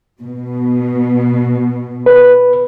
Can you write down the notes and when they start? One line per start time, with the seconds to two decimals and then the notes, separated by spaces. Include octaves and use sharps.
0.21 B2
2.06 B4